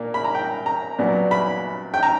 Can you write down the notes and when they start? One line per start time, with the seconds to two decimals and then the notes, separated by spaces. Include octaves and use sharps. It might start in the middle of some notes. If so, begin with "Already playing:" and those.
Already playing: A#2 A#3 D4
0.14 B5
0.24 A#5
0.35 G5
0.66 A#5
0.99 A#2 F#3 B3 D4
1.31 B5
1.94 G5
2.03 A#5